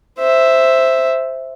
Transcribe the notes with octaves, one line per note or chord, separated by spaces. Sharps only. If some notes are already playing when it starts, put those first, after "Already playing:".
C5 E5